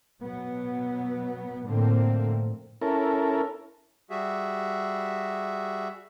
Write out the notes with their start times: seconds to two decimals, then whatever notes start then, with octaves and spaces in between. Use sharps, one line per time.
0.21 B2 F#3 B3
1.65 A2 D3 F3 A3 A#3 C4
2.81 C#4 E4 A4 A#4
4.10 G3 F#4 G#4 E5